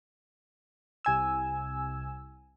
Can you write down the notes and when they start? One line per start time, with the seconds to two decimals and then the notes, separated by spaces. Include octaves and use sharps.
1.05 C2 G#5 E6